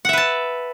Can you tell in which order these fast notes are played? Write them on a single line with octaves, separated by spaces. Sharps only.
F#5 E5 B4 A5